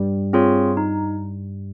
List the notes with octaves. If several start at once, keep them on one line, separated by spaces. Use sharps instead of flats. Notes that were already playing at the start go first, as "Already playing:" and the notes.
Already playing: G2 G3
C4 F4 G#4 C#5
D#4